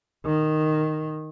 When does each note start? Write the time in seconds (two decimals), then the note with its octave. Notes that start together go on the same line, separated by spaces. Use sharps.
0.25 D#3